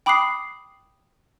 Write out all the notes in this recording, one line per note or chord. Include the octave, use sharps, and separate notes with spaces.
G5 B5 D6 D#6 F#6 C7